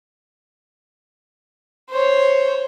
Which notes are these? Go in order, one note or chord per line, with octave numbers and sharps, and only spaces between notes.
C5 C#5